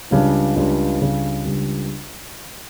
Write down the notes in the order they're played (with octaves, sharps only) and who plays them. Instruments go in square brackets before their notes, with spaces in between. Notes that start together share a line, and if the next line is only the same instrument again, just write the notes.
[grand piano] C#2 C#3 G3 D4
C#2 C#3 G3 D4
C#2 C#3 G3 D4
C#2 C#3 G3 D4